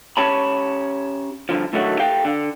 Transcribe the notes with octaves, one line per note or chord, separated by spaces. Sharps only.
C#4 G4 C#5 A5 B5
G2 A#2 D3 F3
A2 D3 D#3 F#3 A3 F#4
G4 A4 F5 G5
D3